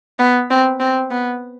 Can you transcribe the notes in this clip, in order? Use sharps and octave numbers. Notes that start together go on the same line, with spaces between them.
B3
C4
C4
B3